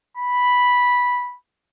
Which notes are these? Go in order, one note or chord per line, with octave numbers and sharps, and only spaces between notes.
B5